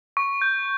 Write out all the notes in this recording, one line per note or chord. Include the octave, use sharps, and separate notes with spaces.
C#6
G6